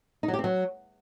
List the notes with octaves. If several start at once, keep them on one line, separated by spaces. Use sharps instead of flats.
D#4
F#3
G4
C4
F#3